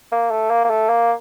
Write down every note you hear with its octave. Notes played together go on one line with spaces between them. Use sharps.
A#3
A3
A#3
A#3
A3
A#3